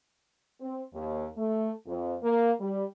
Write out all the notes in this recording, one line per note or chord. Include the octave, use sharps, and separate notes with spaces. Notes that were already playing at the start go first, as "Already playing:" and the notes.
C4
D#2
A3
F2
A#3
G3